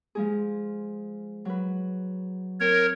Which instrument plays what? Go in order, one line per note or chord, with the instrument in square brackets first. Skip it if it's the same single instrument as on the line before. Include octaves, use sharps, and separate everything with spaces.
[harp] F3 G#3 G#4
F#3 B4
[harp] C4 [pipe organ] A#4 C#5